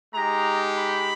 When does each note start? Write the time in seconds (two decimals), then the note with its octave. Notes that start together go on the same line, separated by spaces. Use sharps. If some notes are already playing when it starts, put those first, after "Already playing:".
0.14 G#3 D#4 G4 A#5
0.78 B5